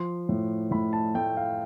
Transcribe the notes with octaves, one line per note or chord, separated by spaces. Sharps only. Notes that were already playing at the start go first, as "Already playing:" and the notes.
Already playing: F3 C6
A2
A2 B5
A5
A3 G5
F5